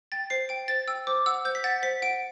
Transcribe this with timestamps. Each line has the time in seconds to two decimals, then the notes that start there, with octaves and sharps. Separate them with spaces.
0.12 G5 A6
0.30 C5 C7
0.49 G5 D7
0.68 C5 A6
0.88 G5 E6
1.07 C5 D6
1.26 F#5 E6
1.45 C5 G6
1.55 B6
1.64 F#5 A6
1.83 C5 B6
2.02 F#5 D7